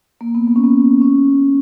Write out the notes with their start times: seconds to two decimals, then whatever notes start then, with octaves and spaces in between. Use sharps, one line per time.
0.21 A#3
0.35 B3
0.48 B3
0.56 C#4
0.64 B3
1.01 C#4